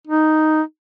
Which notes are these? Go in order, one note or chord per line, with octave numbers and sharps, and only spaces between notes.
D#4